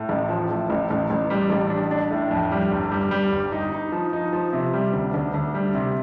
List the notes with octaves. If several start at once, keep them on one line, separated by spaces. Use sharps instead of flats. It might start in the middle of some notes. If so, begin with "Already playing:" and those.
Already playing: A2
A1
F3
A2
A1
A1
A1
G3
A1
D4
D4
A2
F2
G3
G1
G3
G3
G1
D#4
D#4
F3
D#4
F3
C3
G3
D2
D2
D2
G3
C3